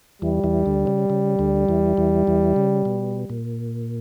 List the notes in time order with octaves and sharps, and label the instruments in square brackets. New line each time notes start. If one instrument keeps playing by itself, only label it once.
[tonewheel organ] E2 E3 [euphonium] G3
[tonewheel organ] E2 E3
D2 D3
C#3
C#3
D2 D3
E2 E3
E2 E3
E2 E3
C#3
B2
A#2